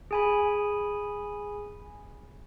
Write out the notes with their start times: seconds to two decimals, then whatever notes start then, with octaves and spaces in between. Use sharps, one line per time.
0.11 G#4 G#5 B5